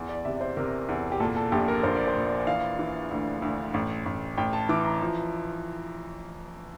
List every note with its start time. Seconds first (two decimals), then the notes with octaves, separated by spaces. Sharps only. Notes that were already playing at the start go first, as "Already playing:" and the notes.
Already playing: E2
0.09 D5
0.25 C3 E5
0.41 C5
0.57 C3 A#4
0.89 E2
1.12 G4
1.20 A#2 A4
1.36 A4
1.52 A#1 G4
1.68 A#4
1.83 A#1 C5
1.95 D5
2.07 C5
2.16 A#2
2.47 E3 F5
2.79 E3
3.11 D2
3.42 D2
3.74 A1
4.06 A1
4.37 A1 G5
4.53 A5
4.69 E3 D6
4.85 A#5
5.01 F3